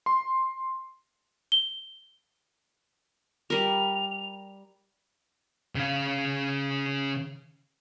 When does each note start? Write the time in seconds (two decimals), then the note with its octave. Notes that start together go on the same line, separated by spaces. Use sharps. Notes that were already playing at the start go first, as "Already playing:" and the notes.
0.06 C6
1.52 G7
3.50 G3 A#4 F7
5.75 C#3 F5